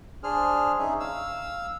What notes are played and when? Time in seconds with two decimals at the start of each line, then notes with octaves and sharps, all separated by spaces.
0.23 D4 G#4 C5 F6
0.79 C#4 D#4 G#4 E5
1.00 F5 E6